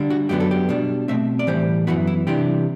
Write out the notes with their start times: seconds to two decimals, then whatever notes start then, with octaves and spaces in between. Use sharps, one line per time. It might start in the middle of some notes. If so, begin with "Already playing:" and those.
Already playing: D3 G3 D4
0.10 F#4
0.29 F#2 F#3 B3 D4 G4
0.40 A4
0.51 G4
0.69 B2 G3 D4
1.08 B2 A3 C4 E5
1.39 D5
1.47 A2 E3 G3 C5
1.87 F#2 E3 B3 F#4
2.07 E4
2.27 C3 E3 G3 D4 G4